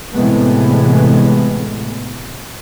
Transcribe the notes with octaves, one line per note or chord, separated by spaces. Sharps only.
A2 C3 E3 G#3 A3 B3